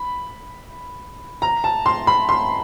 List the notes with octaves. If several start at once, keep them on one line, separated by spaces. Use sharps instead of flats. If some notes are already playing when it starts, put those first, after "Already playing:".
Already playing: B5
A#5
A5
C6
B5
C6